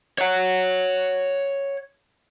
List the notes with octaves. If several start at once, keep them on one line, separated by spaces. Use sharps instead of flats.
C#5 F#5